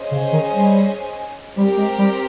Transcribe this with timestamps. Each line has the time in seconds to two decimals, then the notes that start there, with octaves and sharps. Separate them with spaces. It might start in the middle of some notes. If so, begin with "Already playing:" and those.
Already playing: C#4 G#4 C5 D#5 G#5
0.11 C#3
0.32 D#3
0.53 G3
1.56 G3 C4 G4 A#4
1.77 G#3
1.98 G3